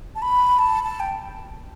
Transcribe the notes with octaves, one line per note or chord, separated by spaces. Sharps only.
A5
B5
A5
A5
G5